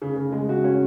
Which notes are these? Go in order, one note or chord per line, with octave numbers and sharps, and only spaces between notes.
C#3
C#3
G#3
F#4
C#4